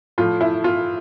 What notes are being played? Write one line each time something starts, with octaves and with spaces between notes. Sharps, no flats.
A2 F3 F4
E4
F4